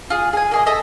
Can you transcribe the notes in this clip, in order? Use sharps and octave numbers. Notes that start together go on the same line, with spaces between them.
F4 G#4
G#4 G#5
A#3 G#4 D#5
A4 D#5 E5